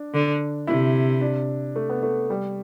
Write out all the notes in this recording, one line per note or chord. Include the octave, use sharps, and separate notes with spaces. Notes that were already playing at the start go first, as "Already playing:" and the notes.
Already playing: D4
D3
C3 E4
D4
A3
B3
A3
G3